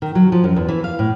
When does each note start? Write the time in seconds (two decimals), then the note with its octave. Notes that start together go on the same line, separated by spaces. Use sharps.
0.02 D#3
0.15 F#3
0.32 F3
0.44 F#2
0.56 E2
0.68 E3
0.84 F5
0.99 A2